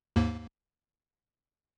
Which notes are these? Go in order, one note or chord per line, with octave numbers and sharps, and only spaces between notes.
D#2 G#2 A#3